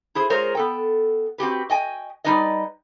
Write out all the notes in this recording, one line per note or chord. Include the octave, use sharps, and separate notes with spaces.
E4 G#4 C5
G#3 F4 G#4 A#4 C5 C#5
B3 A4 G5
C4 F#4 G4 B4
D#5 G5 G#5
G3 A#3 D#4 B4 D5 D#5